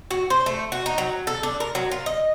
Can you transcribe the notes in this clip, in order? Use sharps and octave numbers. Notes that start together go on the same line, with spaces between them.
F#4
C5
A3
F#4
D#4
F#3
A4
D4
A#4
F#3
F4
D#5